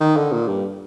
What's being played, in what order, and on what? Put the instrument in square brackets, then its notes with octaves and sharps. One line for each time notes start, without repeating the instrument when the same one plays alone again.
[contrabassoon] D#3
D3
A#2
G2